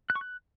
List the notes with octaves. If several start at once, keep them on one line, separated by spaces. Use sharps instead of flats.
F#6
C#6
F#6